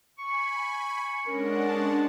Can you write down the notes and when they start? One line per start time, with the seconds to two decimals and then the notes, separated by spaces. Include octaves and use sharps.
0.18 G#5 B5 C#6
1.27 G#3 C#4 D4 A#4 F#5
1.69 A5